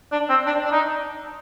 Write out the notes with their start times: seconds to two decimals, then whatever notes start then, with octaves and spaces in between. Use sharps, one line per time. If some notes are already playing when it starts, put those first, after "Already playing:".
0.12 D4
0.29 C4
0.46 D4
0.64 D4
0.72 D#4